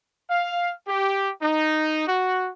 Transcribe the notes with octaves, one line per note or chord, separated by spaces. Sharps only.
F5
G4
D#4
F#4